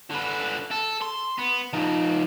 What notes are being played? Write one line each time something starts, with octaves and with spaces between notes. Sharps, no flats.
D3 B4
A4
C6
B3
F3 D#4